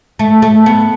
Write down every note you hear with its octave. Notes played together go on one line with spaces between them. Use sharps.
A3
A3
B3